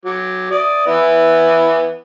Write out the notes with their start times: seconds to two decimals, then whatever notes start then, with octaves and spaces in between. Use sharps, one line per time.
0.06 F#3 D6
0.51 D5 D#6
0.87 E3 B3 E4